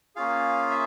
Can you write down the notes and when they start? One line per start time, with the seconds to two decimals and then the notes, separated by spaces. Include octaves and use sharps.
0.16 A#3 C#4 F4 G#4 F5
0.71 E5